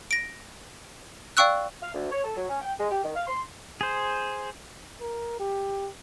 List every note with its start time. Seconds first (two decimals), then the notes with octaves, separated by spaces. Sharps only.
0.11 A#6 D7
1.37 D5 F5 G5 C#6 E6 F#6
1.82 F5
1.94 D2
2.11 C#5
2.24 A4
2.36 F#3
2.49 C#4
2.62 G5
2.79 G#3
2.91 G4
3.04 D#3
3.15 F5
3.27 C6
3.81 G#4 C5
5.00 A#4
5.39 G4